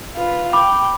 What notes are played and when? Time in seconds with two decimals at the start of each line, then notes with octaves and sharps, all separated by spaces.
0.16 F4 B4
0.53 G5 B5 D6